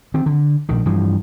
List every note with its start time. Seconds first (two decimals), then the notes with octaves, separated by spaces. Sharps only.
0.14 D#3 C4
0.26 D3
0.69 A#1 D#3
0.86 G2 E3 F3